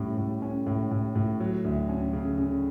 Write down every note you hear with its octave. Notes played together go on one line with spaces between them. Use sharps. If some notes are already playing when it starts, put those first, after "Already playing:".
Already playing: A2 G3 C#4
A2
C#4
A2
A2
A2
F#3
D2
C#4
C#3
C#3